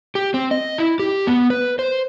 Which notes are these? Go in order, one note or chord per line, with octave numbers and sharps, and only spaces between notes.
G4
C4
D#5
E4
G4
B3
B4
C5